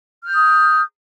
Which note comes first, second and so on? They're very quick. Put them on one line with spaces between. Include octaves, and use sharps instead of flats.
F6 G6 D#6